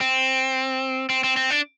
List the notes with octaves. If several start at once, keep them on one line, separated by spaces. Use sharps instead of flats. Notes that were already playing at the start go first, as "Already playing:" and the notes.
C4
C4
C4
C4
D4